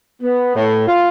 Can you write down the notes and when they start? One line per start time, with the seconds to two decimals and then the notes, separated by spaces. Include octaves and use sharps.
0.22 B3
0.55 A2
0.87 F4